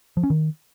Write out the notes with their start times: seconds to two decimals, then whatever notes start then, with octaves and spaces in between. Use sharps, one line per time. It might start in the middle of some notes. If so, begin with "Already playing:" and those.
0.17 F3
0.23 C#4
0.30 D#3